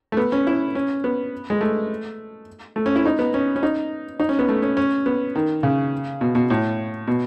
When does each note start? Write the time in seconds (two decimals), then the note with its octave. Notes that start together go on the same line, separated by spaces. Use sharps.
0.12 A3
0.17 B3
0.32 C#4
0.47 E4
0.75 C#4
1.04 B3
1.50 G#3
1.61 A3
2.76 A3
2.86 C#4
2.96 E4
3.06 D#4
3.19 B3
3.34 C#4
3.56 C#4
3.63 D#4
4.20 D#4
4.29 C#4
4.39 B3
4.49 A3
4.62 C#4
4.77 C#4
5.06 B3
5.35 D#3
5.63 C#3
6.21 B2
6.35 B2
6.50 A2
7.07 B2